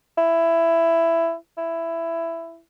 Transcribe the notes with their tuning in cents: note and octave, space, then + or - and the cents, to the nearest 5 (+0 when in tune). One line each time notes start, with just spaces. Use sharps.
E4 +10
E4 +10